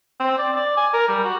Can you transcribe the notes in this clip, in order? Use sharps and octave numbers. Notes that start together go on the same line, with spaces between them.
C4
D5
D5
G#5
A#4
G3
F#4